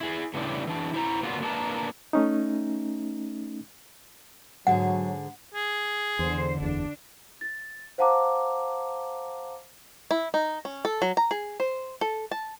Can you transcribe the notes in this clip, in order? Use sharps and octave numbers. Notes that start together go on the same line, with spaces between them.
E4 G#4
A2 C#3 E3 G3 A3 D4
E3 D4
E4 C5 A#5
B2 D3 F3 A#3 B3 F4
A#3 D4 F4 A#4 B4 A5
A3 C#4 D#4
G#2 D3 F#3 G#4 F#5
G#4
E2 D3 C5
F#1 E2 D4
A6
C5 F5 F#5 A5 A#5 D6
E4
D#4
C#4
A4
F#3
A#5
G#4
C5
A4
A5